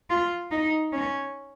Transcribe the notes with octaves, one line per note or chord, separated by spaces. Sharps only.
F4
D#4
C#4